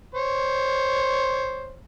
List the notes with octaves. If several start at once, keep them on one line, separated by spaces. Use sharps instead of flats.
C5 C#5